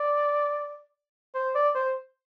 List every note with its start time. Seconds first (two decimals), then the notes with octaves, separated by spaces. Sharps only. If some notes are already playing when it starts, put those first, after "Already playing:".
Already playing: D5
1.35 C5
1.55 D5
1.75 C5